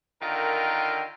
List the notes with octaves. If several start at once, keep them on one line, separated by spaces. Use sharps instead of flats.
D3 D#3 F4 A#4 G5